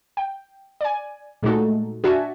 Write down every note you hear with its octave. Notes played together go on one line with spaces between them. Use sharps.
G5
D5 G#5
A#2 G#3 A3 D#4 F#4 A4
D4 F#4 E5 G#5 A5